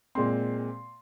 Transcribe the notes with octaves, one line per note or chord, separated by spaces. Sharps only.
A#2 G#3 C4 C6